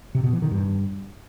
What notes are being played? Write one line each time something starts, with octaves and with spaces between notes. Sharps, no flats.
C3
B2
E3
D#3
G2